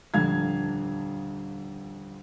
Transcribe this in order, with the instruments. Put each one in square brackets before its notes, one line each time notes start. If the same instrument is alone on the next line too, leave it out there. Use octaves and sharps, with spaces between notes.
[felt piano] D#1 F2 D3 F5 G#6